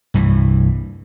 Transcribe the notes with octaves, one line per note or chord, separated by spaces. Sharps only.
C2 G2 E3